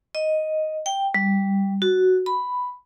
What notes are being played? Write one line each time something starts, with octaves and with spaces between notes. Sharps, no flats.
D#5
G5
G3
F#4
B5